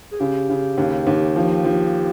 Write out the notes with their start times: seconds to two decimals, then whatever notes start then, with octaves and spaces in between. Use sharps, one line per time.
0.11 G#4
0.20 C#3 G4
0.49 C#3
0.78 D#2
1.07 D#2
1.36 F3
1.65 F3